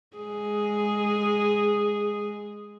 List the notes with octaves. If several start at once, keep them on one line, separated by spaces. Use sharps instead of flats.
G#3 G#4